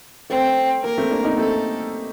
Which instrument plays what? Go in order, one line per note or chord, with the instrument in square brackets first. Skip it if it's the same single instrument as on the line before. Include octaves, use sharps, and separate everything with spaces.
[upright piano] A3 [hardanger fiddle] C4
[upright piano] A#3 [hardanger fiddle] A#4
[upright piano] A3 C4
A#3 D4
C4 D#4
[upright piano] A3 C4 [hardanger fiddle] A4